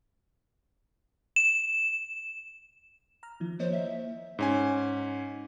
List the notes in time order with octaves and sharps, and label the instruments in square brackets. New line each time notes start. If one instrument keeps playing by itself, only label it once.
[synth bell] E7
[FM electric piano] A#5 F6
D#3 F3 E4
[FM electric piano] A#3 C#5 D#5 [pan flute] C5
[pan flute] E5
[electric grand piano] G#2 C#4 G#5